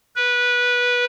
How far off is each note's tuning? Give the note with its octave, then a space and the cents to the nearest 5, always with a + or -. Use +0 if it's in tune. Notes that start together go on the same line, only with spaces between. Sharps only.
B4 -15